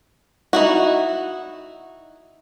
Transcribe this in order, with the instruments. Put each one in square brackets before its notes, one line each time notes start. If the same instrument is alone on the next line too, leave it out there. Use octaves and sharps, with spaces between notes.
[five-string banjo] D#4 E4 F#4